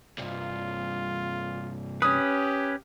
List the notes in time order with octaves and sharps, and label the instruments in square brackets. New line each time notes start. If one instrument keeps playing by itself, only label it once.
[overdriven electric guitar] C2 G2 [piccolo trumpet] F4
[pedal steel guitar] C#4 B4 [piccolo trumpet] G4 [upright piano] D#6